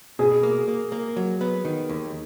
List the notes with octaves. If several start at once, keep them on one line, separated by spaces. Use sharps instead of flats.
B2 G#4
A#3
A#3
A#3
F#3
B3
D#3
D#2